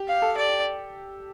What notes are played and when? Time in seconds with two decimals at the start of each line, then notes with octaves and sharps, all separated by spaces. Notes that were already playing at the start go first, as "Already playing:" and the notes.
Already playing: G4
0.08 F5
0.22 A4
0.37 D5